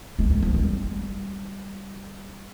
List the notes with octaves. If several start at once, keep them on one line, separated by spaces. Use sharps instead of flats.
G#3
G3
F3
G3